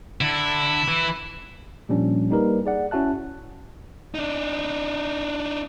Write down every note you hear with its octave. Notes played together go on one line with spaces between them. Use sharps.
D3 E4
E3
A#2 F3 G3 C#4 D4
G3 A#3 D#4 G4 A#4 B4
G#4 D5 F#5
C#4 E4 F#4 E5 A5 F#6
D4 D#4